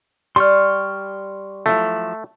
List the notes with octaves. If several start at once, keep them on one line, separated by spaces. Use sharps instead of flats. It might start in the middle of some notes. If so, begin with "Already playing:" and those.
G3 C6 C#6 F6
F3 F#3 A3 E4